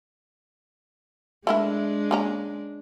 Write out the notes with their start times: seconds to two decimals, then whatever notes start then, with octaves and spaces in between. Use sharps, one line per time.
1.47 G#3 A3 D4 E4 A#4
2.11 A#3 C#4 A#5